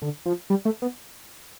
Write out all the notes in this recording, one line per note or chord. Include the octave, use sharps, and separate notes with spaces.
D3
F3
G3
A3
B3